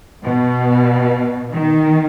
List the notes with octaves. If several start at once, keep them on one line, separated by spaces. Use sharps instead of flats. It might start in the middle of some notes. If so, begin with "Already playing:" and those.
B2
D#3